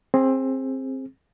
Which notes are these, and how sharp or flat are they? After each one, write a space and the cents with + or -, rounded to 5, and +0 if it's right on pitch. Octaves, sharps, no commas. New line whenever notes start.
C4 +20 G#4 +0